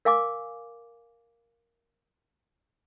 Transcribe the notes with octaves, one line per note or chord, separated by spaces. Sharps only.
A#4 F5 G#5 D6